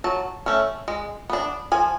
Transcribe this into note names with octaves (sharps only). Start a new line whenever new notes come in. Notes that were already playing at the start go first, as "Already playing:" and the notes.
F#3 A5
A3 C#4
G#3
B3 D4
F3 G#5